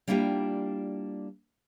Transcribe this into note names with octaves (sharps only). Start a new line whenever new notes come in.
G3 A#3 D4 E4 F4 G4